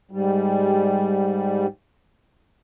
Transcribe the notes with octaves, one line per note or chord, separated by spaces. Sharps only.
G#2 G3